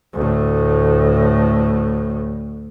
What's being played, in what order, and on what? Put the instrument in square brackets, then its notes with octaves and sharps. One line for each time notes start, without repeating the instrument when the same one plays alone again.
[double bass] D2 A2